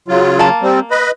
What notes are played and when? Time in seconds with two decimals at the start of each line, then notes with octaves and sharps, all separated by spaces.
0.08 C#3 F#3 F4
0.39 A#3 A5
0.62 G3 C4
0.91 B4 D#5 B5